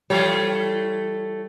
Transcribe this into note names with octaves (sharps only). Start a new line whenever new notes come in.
E3 G3 A3 C#5